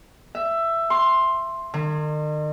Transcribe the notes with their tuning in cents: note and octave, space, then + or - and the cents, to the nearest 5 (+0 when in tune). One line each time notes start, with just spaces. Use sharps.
E5 +15
C6 +10
D#3 -40